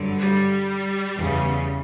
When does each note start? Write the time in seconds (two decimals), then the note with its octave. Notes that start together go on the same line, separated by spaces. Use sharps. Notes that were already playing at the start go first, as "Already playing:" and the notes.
Already playing: G2 D3 F#3
0.21 G3
1.15 E2 C#3 E3